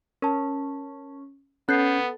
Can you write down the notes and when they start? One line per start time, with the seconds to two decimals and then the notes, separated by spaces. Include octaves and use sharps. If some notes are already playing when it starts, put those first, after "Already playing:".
0.22 C#4 A#4 A5
1.69 B3 C#4 A4 F#6 G6 C7